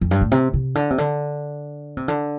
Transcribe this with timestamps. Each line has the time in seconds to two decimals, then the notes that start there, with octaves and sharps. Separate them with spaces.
0.01 F2
0.11 G2
0.21 A2
0.32 C3
0.54 C3
0.75 D3
0.90 C3
0.98 D3
1.97 C3
2.08 D3